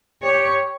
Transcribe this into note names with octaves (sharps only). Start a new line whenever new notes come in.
G4 C#5